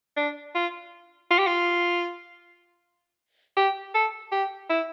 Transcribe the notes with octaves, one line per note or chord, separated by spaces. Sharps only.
D4
F4
F4
G4
F4
G4
A4
G4
E4